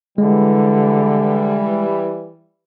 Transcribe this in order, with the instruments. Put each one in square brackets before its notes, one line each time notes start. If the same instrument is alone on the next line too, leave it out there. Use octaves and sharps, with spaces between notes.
[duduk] D3 [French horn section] E3 G3 [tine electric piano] G#3